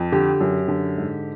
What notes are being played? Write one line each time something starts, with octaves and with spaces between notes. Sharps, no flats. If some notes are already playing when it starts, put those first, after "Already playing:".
Already playing: F2
D3 G4
F#2
D3
G#2